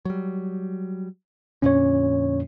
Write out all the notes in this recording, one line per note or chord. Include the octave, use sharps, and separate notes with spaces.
F#3 G3
F2 A#2 D3 C#4 C#5